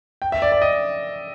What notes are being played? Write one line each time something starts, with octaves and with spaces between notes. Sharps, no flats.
G5
E5
D5
D5
D#5